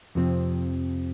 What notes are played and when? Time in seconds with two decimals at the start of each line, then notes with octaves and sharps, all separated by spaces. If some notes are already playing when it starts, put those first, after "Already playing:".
0.15 F2 C3 F3 C4